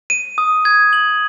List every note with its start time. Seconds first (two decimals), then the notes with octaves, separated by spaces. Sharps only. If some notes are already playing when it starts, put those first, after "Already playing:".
0.10 D#7
0.38 D#6
0.65 G#6
0.93 F#7